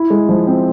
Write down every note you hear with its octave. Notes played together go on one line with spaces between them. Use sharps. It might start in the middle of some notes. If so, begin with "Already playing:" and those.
Already playing: E4
G#3
F3
C4